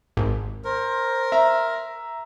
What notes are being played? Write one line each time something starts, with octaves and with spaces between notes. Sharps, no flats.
G#1
A#4 C5
E5 A#5